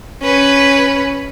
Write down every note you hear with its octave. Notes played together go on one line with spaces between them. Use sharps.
C#4 B4